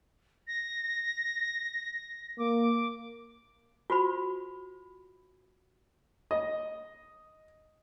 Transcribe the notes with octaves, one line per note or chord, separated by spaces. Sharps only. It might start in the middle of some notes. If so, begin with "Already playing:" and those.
A#6
A#3 D6
F4 F#4 C5 B5
D#5